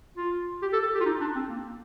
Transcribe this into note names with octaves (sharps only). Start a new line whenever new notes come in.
F4
G4
A4
A4
G4
F4
D#4
D4
C4
A#3